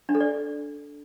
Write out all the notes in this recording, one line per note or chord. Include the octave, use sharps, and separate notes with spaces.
D4
A4
D5